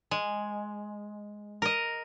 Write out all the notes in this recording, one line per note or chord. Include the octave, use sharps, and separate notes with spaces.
G#3
A#4 D#5